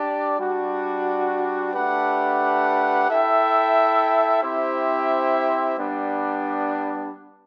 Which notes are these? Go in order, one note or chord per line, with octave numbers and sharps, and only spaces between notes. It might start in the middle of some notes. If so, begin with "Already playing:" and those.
Already playing: D4 G4 D5
G3 D4 F#4
A3 D4 G4 B4 F#5
E4 A4 E5 G5
C4 E4 G4 C5 E5
G3 B3 D4